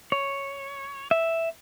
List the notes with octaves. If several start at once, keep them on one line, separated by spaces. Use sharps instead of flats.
C#5
E5